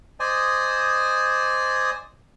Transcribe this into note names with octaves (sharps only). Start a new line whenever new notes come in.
C5 D5 D#5 G#5 D#6